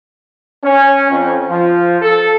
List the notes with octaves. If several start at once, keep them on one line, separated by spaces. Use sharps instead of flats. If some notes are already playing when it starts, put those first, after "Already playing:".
C#4
F2
F3
A4